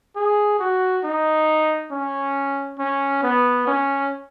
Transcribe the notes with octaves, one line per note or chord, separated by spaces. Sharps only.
G#4
F#4
D#4
C#4
C#4
B3
C#4